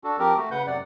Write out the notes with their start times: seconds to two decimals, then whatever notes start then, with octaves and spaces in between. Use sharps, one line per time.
0.04 D4 F#4 A4
0.19 F3 C4 G4 A#4
0.37 A3 F#4
0.51 C#3 B4 F#5 G6
0.67 F#2 C3 D5 F#5